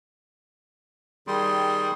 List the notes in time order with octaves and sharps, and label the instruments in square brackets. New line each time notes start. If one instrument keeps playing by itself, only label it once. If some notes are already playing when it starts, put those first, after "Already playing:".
[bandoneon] D#3 G#4 C6 [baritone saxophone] G3